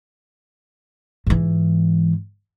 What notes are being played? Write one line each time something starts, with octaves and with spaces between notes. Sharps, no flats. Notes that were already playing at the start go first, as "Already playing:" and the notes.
G#2 E3